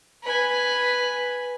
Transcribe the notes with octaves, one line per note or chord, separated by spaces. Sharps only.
B4 G#5